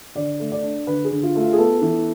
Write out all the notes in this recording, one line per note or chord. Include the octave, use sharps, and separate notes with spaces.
D3 D5
A3
D5
D4
D3 B4
G#4
D3
F4
A3
F4
G#4
B3 A4
E3